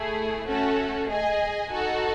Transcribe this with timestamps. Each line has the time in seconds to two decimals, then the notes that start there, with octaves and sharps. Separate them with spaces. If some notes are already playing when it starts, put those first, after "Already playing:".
Already playing: A3 E4 G#4
0.45 A3 C#4 F#4 A4
1.09 G#4 D#5 G#5
1.71 D#4 F#4 A4